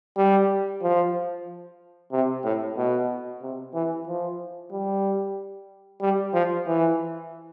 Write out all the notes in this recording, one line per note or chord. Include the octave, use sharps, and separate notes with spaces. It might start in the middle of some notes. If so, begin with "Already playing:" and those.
G3
F3
C3
A2
B2
C3
E3
F3
G3
G3
F3
E3